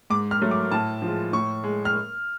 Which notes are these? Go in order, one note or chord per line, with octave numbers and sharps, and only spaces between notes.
G#2 D6
F6
F#3 A3
D6
A2 A5
F3 G#3
A2 C#6
G#3
F6